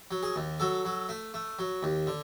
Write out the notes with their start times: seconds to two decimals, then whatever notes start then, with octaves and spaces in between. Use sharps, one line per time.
0.11 F#3
0.23 G#4
0.36 D#2
0.60 F#3 A4
0.85 F#3
1.09 A3
1.34 A3
1.59 F#3
1.83 D#2
2.07 D3